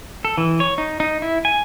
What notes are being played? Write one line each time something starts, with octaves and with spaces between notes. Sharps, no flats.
A4
E3
C#5
D#4
D#4
E4
G#5